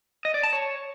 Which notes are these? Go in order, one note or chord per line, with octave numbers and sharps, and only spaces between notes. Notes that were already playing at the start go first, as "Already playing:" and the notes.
D#5
D5
A5
C#5